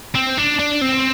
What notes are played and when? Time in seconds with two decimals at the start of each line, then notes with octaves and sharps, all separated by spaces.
0.15 C4
0.37 D4
0.59 D4
0.81 C4